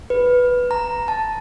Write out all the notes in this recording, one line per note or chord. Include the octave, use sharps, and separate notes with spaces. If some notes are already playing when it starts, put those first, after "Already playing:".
B4
A#5
A5